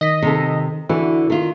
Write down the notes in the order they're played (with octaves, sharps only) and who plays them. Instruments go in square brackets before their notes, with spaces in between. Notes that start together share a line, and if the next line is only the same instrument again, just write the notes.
[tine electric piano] D#3 B6 [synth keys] D#5
[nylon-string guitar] C3 D#4 A4
[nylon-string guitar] D3 [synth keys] E3 [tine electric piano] E4 F#4 E5
[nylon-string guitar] D#3 F4